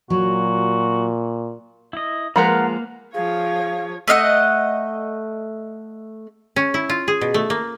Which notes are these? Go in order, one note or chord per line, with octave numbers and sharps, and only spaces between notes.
A#2 F#3 F#4
E4 D#5
F3 G#3 A#3 A#4 B4 F5 F#5 A#5
F3 G#4 C#5 F5
A3 D#5 F5 F#5
C#4
E4
F4
G#4
B2
A3
A#3